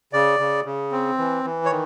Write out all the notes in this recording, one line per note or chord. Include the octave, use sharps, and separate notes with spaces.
C#3 D5
C#3
C#3
C4
E3
E3
C#5
D#3